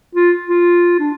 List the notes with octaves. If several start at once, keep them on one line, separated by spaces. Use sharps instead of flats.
F4
F4
D4